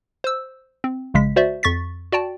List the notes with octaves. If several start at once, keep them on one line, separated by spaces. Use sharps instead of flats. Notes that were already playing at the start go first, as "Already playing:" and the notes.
C5 E6
C4
A#1 C#3 G#3 B6
F#4 C5 D5 E5
F2 C#6 A6 B6
F#4 D5 G5 A5